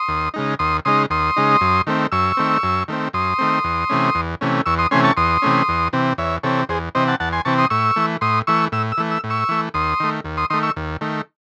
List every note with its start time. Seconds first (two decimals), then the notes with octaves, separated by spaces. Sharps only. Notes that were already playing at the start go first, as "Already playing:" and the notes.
Already playing: C6 D#6
0.09 D#2
0.34 C#3 G#3 D#4
0.59 D#2 C6 D#6
0.85 C#3 G#3 D#4 C6 D#6
1.10 D#2 C6 D#6
1.37 C#3 G#3 D#4
1.61 F#2
1.87 D#3 A3 C4
2.12 F#2 C#6 E6
2.37 D#3 A3 C4
2.63 F#2
2.88 D#3 A3 C4
3.13 F#2 C6 D#6
3.39 D#3 A3 C4
3.64 E2
3.90 C3 E3 A3 C#4
4.15 E2
4.41 C3 E3 A3 C#4
4.66 E2 C#6 E6
4.78 C6 D#6
4.91 C3 E3 A3 C#4 G#5 C6
5.04 A5 C#6
5.17 E2 C6 D#6
5.42 C3 E3 A3 C#4
5.68 E2
5.93 C3 E3 C4
6.18 E2 C#5 E5
6.43 C3 E3 C4 A4 C#5
6.69 E2 G#4 C5
6.95 C3 E3 C4 C5 D#5
7.07 F#5 A5
7.20 E2 F#5 A5
7.33 G#5 C6
7.45 C3 E3 C4 A5 C#6
7.58 C6 D#6
7.70 A2 C#6 E6
7.96 E3 A3
8.21 A2 C6 D#6
8.47 E3 A3 C#6 E6
8.72 A2 E6
8.92 E6
8.98 E3 A3
9.11 E6
9.24 A2
9.30 C#6 E6
9.49 E3 A3
9.74 D#2 C6 D#6
10.00 D#3 A3
10.24 D#2
10.37 C6 D#6
10.50 D#3 A3 C6 D#6
10.63 C#6 E6
10.76 D#2
11.01 D#3 A3